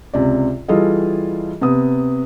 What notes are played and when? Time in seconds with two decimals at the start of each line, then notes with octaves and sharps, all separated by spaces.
0.14 C#2 C3 D5
0.68 E3 G3 F4 G#4 A4 D#5
1.61 C3 B3 D#6